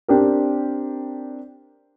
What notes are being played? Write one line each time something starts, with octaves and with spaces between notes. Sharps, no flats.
C4 D4 G4 A#4